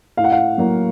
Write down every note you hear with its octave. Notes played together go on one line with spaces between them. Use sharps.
A2 F5
F#5
F5
F#3 A#3